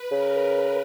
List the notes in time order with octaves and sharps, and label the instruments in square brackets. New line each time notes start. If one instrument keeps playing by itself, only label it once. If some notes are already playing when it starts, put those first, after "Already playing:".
Already playing: [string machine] B4
[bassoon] C#3 [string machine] A#4